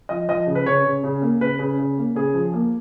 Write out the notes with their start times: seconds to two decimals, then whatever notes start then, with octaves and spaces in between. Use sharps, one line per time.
0.09 F3 D#5
0.28 F3 D#5
0.47 C#3
0.55 B4
0.66 C#3 C#5
0.84 C#3
1.04 C#3
1.22 A#3
1.40 C#3 B4
1.59 C#3
1.79 C#3
1.98 A#3
2.15 C#3 G#4
2.34 F3
2.54 A#3